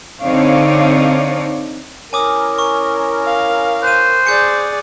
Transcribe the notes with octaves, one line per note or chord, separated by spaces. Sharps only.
D3 C4 D#4 C#5 D5 F5
C#4 E4 A#4 G#5 D6 D#6
C#6
F5
C5 F#6 D#7
G#4 D5 G6 C#7